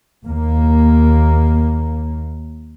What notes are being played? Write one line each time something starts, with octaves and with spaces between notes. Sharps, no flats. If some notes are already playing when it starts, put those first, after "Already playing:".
D#2 A#3